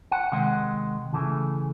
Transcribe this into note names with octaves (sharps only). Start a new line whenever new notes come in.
F#5
C3 D#3 G#3 F#5
C#3 E3 A3